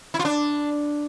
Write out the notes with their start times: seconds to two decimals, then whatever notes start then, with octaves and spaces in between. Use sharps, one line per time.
0.14 E4
0.19 F4
0.25 D4